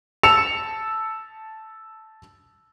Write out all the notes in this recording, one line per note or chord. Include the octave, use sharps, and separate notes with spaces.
A5 E6 C#7 E7 F7